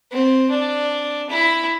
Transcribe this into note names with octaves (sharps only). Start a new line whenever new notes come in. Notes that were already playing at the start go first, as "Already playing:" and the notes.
C4
D4
E4